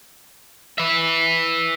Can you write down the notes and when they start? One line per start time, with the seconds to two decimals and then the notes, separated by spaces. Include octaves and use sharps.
0.78 B4 E5